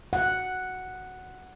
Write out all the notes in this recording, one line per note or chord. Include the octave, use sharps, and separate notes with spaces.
F#5